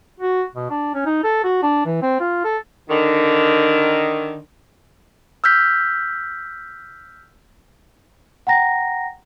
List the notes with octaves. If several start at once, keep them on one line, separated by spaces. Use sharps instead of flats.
F#4
B2
D4
C#4
D#4
A4
F#4
D4
E3
C4
F4
A4
D3 D#3
E6 F6 G6 B6
F#5 G5 A#5 A#6